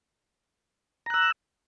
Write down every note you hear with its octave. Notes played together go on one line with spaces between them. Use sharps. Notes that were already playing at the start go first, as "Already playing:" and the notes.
A#5 E6 F#6